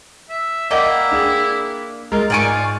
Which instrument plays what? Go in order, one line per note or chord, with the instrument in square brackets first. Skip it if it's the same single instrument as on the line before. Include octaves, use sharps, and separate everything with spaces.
[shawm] E5
[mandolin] A#3 G5 [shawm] E4 [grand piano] D5 D#5 F#5
[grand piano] D4 G#4 D5
[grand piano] G#3 A#4 [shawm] F4
[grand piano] G#2 D7 [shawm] F4 [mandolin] D5 G#5 C#6